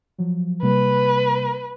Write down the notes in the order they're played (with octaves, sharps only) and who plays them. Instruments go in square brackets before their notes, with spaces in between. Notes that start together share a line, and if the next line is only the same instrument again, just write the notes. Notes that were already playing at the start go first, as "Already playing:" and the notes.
[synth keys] F3 F#3
[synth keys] C3 G3 A#3 [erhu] B4